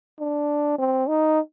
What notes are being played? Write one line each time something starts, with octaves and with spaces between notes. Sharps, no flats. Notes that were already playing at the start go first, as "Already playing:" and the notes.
D4
C4
D#4